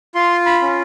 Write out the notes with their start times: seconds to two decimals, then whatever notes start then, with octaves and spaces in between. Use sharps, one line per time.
0.15 F4 C6
0.46 B5
0.62 C#4